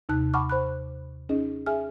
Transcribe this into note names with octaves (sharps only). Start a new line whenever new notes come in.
D#2 C3 D#4 A5 F#6
F#5 A5 B5 C#6 D6 F6
C5 B5 F#6
C#4 D#4 G#4 D#5
G#4 E5 G#5 F6